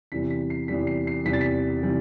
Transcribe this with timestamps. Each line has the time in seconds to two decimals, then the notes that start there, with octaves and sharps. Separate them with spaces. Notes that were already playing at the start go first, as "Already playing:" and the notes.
0.12 E2 C3 E3 G3 B6
0.30 B6
0.50 C7
0.68 E2 C3 E3 G3 B6
0.87 C7
1.07 C7
1.25 E2 C3 E3 G3 B6
1.33 A6
1.41 B6
1.83 C3 E3 G3